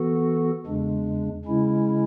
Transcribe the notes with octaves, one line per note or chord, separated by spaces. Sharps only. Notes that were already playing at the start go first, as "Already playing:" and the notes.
Already playing: E3 B3 F#4 A4
E2 C#3 G#3 D4
C#3 G#3 C#4 E4